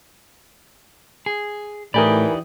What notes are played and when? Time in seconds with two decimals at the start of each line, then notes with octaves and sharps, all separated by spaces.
1.26 G#4
1.94 A2 E3 D#4 G4 A#4 D5 G#5 B5